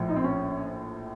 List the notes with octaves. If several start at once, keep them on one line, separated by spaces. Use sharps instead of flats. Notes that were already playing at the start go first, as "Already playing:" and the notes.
Already playing: A#1 A2 F3
D#4
C4
C#4